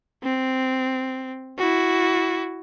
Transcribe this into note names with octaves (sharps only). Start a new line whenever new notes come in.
C4
E4 F#4